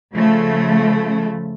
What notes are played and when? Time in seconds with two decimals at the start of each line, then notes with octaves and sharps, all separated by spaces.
0.14 C#3 F3 A3